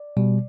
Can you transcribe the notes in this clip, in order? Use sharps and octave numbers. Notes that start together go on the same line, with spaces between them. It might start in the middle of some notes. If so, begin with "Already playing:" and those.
Already playing: D5
B2 G3